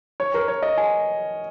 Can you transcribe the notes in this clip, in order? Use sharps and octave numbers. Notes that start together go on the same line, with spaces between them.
C#5
A#4
C#5
D#5
G#5